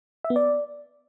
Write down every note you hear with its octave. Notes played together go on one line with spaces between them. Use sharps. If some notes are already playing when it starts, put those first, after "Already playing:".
E5
B3
D5